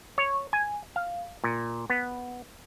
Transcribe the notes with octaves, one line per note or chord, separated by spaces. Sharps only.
C#5
G#5
F5
A#2
B3